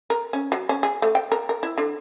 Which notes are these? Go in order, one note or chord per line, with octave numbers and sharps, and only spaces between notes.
A#4
C#4
F#3
C#4
G#4
A3
G5
A#4
A#4
E4
D3